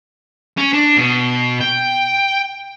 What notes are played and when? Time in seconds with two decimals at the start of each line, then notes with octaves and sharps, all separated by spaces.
0.58 C#4
0.73 D4
0.98 B2
1.60 G5